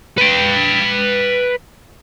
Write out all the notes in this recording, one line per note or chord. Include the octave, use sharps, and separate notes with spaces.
B4 G5